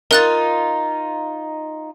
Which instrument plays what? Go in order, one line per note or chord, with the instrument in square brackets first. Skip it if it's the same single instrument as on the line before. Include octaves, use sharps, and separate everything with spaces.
[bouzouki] D#4 F4 [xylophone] A#4 F#6 A6